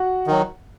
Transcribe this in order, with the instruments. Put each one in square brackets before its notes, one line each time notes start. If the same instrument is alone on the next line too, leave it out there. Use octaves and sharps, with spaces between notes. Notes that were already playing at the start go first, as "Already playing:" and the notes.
Already playing: [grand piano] F#4 F#5
[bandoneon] D#3 F#3